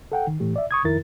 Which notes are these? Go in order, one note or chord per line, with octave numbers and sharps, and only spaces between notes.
A4 F#5 G5
D#3
A2 E3 A3 G4
D5 E5
C#6 D#6 G#6
F2 D#3 E4 A#4 A6